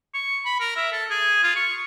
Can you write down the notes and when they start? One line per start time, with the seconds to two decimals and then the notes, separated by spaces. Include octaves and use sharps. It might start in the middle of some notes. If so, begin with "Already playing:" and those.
0.14 C#6
0.45 B5
0.60 A#4
0.77 E5
0.93 A4
1.10 G#4
1.43 F4
1.56 C#6